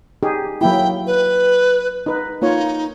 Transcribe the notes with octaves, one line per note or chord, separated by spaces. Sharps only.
D#4 G4 G#4
F#3 A#3 E4 G5
B4
D#4 B4
A#3 D#4 F4 C#5